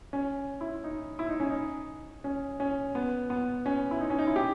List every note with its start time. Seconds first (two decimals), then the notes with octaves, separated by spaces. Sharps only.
0.13 C#4
0.61 E4
0.84 D#4
1.19 E4
1.29 D#4
1.40 C#4
1.50 D#4
2.24 C#4
2.60 C#4
2.95 B3
3.30 B3
3.66 C#4
3.91 E4
4.01 D#4
4.10 C#4
4.19 D#4
4.27 E4
4.36 G4